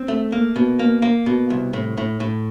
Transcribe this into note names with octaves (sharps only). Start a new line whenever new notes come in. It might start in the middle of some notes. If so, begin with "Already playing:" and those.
Already playing: C4
A3
A#3
B2
A#3
A#3
B2
C2
A2
A2
A2